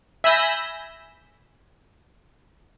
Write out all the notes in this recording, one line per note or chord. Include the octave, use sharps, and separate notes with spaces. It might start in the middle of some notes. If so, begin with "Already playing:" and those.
E5 G#5 B5 E6 G6 A#6